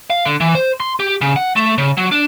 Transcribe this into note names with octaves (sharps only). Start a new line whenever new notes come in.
F5
D3
E3
C5
C6
G4
C#3
F#5
A3
C#3
F#3
D4